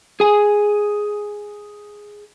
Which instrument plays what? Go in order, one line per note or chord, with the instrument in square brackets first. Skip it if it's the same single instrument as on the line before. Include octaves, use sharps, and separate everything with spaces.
[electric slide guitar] G#4 G#5